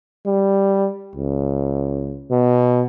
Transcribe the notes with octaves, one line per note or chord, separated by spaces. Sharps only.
G3
C#2
B2